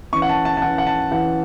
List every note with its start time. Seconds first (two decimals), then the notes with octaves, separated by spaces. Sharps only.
0.13 E3 C#4 C#6
0.22 F#5
0.29 A5
0.45 A5
0.57 A5
0.62 C#4 F#5
0.65 E3
0.78 F#5
0.87 A5
1.11 E3 C#4 F#5